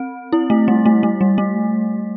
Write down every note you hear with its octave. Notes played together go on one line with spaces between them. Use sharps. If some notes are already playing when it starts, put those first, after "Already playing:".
Already playing: C4
E4
A3
G3
A3
A3
G3
A3